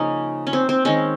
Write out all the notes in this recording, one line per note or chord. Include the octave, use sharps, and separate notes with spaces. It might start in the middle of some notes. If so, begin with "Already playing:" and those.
Already playing: C#3 F3 A#3 C#4 D#4
C#4
C4
C4
D#3 G#3 C4 C#4